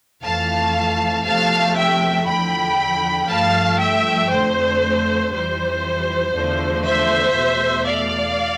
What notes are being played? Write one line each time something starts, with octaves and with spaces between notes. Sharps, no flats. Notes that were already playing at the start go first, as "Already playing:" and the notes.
F2 E3 A3 F5 A5
E2 C3 F3 A3 F5 A5
E5 G5
E2 D3 F3 G5 B5
G2 F3 A3 F5 A5
E5 G5
F2 D3 A3 C5
F2 E3 G3 C5
E2 D3 F3 A3
C5 E5
E2 B2 A3
D5 F5